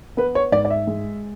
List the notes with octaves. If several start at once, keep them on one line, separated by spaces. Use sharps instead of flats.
B3 B4
C#5
G#2 D5
D5
E5
G#3